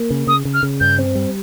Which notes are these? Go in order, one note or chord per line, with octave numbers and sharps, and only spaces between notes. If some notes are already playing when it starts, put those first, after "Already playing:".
Already playing: A#3
C#3
C#3 D#6
C#3
F6
C#3
G2 G6
C4
G3